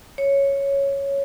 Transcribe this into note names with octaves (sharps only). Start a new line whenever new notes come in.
C#5